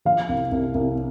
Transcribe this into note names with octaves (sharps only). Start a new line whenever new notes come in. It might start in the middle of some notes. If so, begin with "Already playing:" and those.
F3 F5
C2
C2
C2